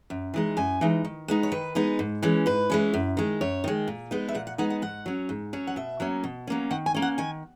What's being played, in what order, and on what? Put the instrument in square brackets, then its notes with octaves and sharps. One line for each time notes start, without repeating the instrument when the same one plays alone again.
[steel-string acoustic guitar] F#2
E3 G#3 D#4
F#2 G#5
E3 G#3 D#4
D#3
G#3 B3 D#4
C#5
D#3 B4
G#3 B3 D#4
G#2
E3 G#3 C#4
G#2 B4
E3 G#3 C#4
F#2
D#3 G#3
F#2 C#5
D#3 G#3
A#2
G#3 B3 D#4
E5
A#2 F#5
F#5
G#3 B3 D#4 F#5
F#5
G#2 F#5
F#3 C#4
G#2
F#3 C#4
F#5
B2 E5
F#3 A#3 C#4
B2
F#3 A#3 C#4
D#3 F#5
G#5
A#3 C#4
F#5
D#3 G#5